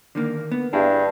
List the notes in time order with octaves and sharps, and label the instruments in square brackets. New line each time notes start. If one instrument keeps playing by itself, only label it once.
[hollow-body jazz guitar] D3 D#3 A#3
B3
[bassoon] G2 [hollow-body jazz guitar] E4 G#4